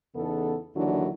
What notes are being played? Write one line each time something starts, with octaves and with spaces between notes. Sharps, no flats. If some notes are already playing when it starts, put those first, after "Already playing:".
E2 C#3 B3 D#4 A4
D#2 D3 E3 F#3 D4 E4